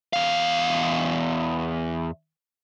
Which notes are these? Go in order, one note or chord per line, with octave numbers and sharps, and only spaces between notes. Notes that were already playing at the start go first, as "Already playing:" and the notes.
E2 F5